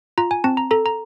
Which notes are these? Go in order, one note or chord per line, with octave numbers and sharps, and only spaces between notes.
F4 A#5
G#5
C4 A5
A#5
A4 A#5
A#5